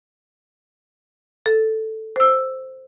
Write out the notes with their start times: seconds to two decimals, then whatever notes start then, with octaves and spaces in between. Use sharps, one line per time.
1.46 A4
2.16 C5 E6